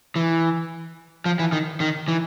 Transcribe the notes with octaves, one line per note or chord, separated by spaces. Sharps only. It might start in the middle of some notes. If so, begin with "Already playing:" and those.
E3
F3
E3
D#3
D#3
E3